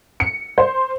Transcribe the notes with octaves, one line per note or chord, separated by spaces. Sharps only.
C#7
C5